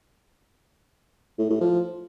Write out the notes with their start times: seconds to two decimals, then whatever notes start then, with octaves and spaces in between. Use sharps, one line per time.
1.39 A2
1.50 A2
1.61 F3